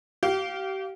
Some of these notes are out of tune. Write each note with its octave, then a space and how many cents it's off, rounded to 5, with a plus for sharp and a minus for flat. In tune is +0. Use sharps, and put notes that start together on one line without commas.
G4 -35 F5 +0